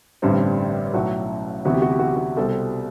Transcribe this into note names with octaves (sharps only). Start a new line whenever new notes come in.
A1 G2 D3 G3 C4
B1 A2 F#3 F#4
D2 C3 E3 B3 F#4
G4
F#4
G4
F#4
G4
F#4
C2 B2 G3 C4 A4